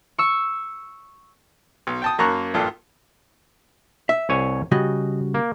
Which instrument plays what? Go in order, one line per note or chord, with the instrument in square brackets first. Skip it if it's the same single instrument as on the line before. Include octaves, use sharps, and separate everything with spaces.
[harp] C#6 E6
[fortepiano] B1
G5 A5 D#6
F#2 A#3 A5 A#5 C#6 F#6
A#1 G2 F4 A4
[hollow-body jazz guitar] E5
[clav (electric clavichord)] C2 C#5 G#5
[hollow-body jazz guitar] C#3 G3 F#4 [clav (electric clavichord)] D#5
[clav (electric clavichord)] A#3